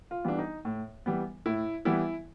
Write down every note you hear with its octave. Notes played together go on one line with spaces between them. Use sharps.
F4
E3 G3 B3 D4
D#4
A2
E3 G3 B3
A2 E4
E3 G3 B3 E4